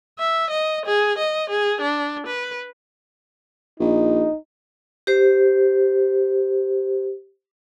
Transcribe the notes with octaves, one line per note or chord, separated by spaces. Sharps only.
E5
D#5
G#4
D#5
G#4
D4
B4
A#1 D#4
G4 C5